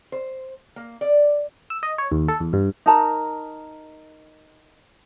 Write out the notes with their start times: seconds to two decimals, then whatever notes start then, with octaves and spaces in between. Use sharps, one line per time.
0.12 C5
0.76 A#3
1.01 D5
1.70 E6
1.83 D#5
1.98 C#5
2.12 D#2
2.28 A4
2.40 E2
2.53 G2
2.86 D#4 A#4 A5 A#5